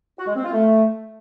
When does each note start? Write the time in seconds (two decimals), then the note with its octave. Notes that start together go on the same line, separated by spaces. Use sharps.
0.19 F#4
0.27 G#3
0.36 C4
0.44 F4
0.53 A3